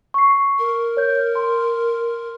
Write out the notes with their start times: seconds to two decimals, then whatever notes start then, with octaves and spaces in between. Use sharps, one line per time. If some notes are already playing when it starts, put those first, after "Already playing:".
0.14 C#6 C7
0.59 A#4
0.97 C#5 G6
1.35 C6